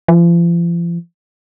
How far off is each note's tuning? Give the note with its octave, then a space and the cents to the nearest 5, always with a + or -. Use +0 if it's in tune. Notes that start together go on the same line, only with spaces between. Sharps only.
F3 -40